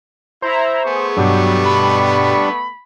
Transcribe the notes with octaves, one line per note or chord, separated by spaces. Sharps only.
E4 C5 E5 A#5
A3 B3 G#4 C#6
G2 B2 F#3 G3 D4 G4
B5